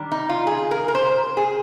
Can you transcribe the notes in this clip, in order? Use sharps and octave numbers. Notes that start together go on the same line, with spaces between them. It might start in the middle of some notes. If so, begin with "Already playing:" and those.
Already playing: D#3 G3 D4
D#4
F4
G#4
A#4
A#4
C5
G#4